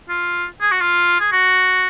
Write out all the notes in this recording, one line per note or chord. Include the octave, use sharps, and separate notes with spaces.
F4
G#4
F#4
F4
G#4
F#4